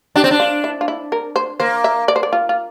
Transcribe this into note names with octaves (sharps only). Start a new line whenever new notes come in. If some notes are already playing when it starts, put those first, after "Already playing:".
D4 G4
C4
D4
F4
E4
F4
E4
A#4
C5
A#3 C5
E5
D5
C5
D5
F4
F4